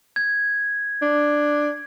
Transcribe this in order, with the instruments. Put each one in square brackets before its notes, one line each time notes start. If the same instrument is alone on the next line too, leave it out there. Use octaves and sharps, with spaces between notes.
[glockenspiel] G#6
[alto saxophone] D4